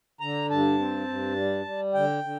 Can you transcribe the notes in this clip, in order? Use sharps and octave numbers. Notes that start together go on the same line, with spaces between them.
D3 A#5
G2 A5
C4
G2
G3
G3
D3 G5
D3